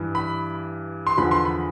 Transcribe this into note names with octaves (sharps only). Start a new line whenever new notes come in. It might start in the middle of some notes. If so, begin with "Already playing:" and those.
Already playing: G2 E3 G3
B5
C6
E2 D3 F3 B5
C6
B5